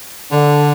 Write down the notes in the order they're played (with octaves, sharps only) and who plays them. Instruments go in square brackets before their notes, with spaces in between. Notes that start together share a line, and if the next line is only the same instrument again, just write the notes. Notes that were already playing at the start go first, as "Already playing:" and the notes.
[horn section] D3